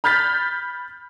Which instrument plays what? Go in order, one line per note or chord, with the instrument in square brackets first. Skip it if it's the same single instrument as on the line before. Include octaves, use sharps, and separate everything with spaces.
[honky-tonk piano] B5 F6 G6 A6 B6